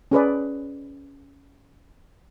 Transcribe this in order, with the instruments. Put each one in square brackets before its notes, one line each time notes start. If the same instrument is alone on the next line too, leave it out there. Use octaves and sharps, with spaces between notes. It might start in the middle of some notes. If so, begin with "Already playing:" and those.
[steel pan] C#4 G#4 B4 D5